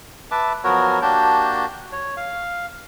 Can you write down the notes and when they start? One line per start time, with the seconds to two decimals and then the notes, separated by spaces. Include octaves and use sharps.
0.31 B4 E5 A5 D6
0.64 F3 F#3 B3 F#4 A#4 C#5
1.02 A#3 D4 F#4 G4 A5 G6
1.92 C#5
2.17 F5